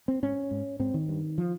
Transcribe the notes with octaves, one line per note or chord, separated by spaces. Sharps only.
C4
G#2 C#4
G#2
G#2 C4
D#3
G2
F3